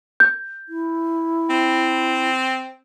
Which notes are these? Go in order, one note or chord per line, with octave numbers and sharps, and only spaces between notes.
G6
E4
C4